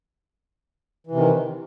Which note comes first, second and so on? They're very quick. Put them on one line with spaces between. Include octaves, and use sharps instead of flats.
E3 C3 D#3